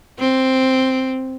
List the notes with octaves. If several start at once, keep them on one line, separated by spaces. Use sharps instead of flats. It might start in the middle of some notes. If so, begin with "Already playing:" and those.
C4